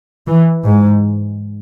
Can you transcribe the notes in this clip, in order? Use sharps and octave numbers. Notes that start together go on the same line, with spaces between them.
E3
G#2